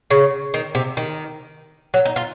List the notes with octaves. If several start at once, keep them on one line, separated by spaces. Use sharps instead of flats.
C#3
D#3
C3
D#3
F#3
D#4
F4